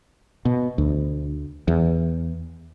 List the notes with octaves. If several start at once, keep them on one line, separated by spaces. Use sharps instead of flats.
B2
D2
E2